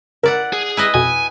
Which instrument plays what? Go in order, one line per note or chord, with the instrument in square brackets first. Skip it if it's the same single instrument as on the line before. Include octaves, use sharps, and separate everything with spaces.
[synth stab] C#3 A#4 [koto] E4 D5 F#5
[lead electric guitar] G#4
[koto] E4 B4 D#5
[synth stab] F2 B2 [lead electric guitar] G#5